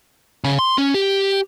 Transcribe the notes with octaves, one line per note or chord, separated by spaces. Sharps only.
C#3
C6
C#4
G4